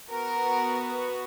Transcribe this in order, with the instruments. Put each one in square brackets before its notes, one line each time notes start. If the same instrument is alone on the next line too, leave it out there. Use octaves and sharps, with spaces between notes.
[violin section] B3 F#4 A#4